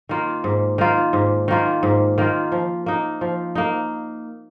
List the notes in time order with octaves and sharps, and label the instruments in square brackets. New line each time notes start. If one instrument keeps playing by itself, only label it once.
[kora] D#3 A#3 F4
G#2
D#3 A#3 F4
G#2
D#3 A#3 F4
G#2
D#3 A#3 F4
F3
A#3 D#4
F3
A#3 D#4